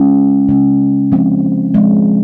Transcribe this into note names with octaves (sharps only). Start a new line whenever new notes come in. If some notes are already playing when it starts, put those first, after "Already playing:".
Already playing: C#3 G#3 C#4
C#3 G#3 C#4
F3 G#3 C4
F3 G#3 C4